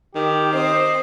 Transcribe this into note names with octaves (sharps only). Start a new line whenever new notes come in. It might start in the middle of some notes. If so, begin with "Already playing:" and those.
D#3 G4
C4 C5 D#5